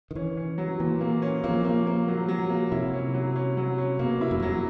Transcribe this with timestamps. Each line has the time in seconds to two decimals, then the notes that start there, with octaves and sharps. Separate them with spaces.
0.11 D#3
0.15 E3 C#4
0.37 C#4
0.58 F#3
0.80 A#2 E3
1.01 A#3
1.22 C#4
1.44 F3 A#3
1.64 A#3
1.86 A#3
2.08 F#3
2.28 F#3
2.50 A#3
2.72 C3 E4
2.93 C#4
3.14 F#3
3.36 C#4
3.57 F#3
3.78 C#4
3.99 B2 A#3
4.21 E4
4.31 F#2
4.40 F2
4.42 F#3